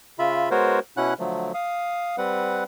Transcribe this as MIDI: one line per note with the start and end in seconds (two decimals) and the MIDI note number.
0.19 0.49 49
0.19 0.49 65
0.19 0.49 76
0.19 0.49 83
0.51 0.79 56
0.51 0.79 59
0.51 0.79 66
0.51 0.79 70
0.51 0.79 72
0.51 0.79 73
0.97 1.14 47
0.97 1.14 61
0.97 1.14 64
0.97 1.14 78
0.97 1.14 90
1.19 1.52 50
1.19 1.52 53
1.19 1.52 54
1.19 1.52 57
1.54 2.16 77
1.54 2.16 87
2.18 2.64 55
2.18 2.64 60
2.18 2.64 71
2.18 2.64 78